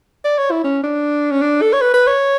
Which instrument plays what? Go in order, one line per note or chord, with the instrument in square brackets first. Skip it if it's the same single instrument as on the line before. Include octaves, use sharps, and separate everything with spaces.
[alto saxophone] D5
C#5
E4
C#4
D4
C#4
D4
A4
C#5
B4
B4
C#5